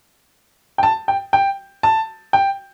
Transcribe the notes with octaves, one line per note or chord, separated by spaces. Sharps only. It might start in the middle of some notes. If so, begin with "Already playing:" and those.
G5
A5
G5
G5
A5
G5